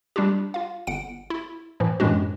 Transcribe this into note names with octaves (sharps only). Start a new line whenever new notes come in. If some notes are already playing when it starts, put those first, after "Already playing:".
G3 D4 F4 G4
F4 F5
G1 F#5 D7
E4
A2 E3 F3
F#2 A2 E3 G#3 D4 F#4